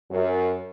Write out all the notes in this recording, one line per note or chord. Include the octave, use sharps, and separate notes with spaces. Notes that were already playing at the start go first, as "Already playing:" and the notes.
F#2